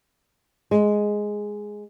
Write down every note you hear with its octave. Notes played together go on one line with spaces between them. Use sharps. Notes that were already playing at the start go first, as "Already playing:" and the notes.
G#3